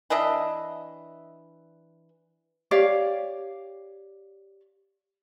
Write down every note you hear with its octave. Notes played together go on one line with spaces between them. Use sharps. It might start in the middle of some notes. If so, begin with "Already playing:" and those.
E3 D4 D#5 E5
G4 C#5 D5 F5